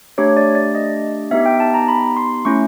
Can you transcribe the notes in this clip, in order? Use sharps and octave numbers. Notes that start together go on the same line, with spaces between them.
A3 D4 G4 C#5
D5
D5
D#5
B3 D#4 G4 E5
G5
A5
A#5
B5
C6
A3 C#4 E4 C#6